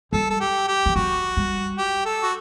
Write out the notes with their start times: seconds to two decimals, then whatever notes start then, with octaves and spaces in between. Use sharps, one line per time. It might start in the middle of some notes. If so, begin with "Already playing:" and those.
0.13 G3 A4
0.30 A4
0.41 G4
0.68 G4
0.86 E3
0.95 F#3 F#4
1.37 G3
1.78 G4
2.05 A4
2.23 F#4